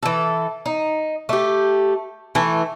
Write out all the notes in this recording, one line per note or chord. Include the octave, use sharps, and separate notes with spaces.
E3 A4
D#4
A3 G4
E3 A3